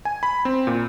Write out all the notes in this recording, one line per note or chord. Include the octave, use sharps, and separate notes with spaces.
G#5
B5
C4
A#2